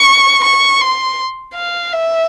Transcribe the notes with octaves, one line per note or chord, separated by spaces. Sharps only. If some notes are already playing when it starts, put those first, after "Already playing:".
Already playing: C#6
C#6
C6
F5
E5